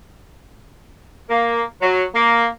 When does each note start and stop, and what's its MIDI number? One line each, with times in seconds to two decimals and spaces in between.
1.29 1.61 58
1.82 2.04 54
2.15 2.45 58